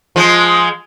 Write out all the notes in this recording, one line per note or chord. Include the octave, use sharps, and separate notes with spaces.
F3 G#3